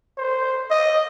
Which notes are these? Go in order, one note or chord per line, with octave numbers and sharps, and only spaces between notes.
C5
D#5